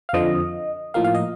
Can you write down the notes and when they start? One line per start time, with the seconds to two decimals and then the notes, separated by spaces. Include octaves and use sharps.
0.09 F5
0.13 F2 D3 F3 D#5
0.94 A2 F3 A#3 F5
1.04 F5
1.15 D#5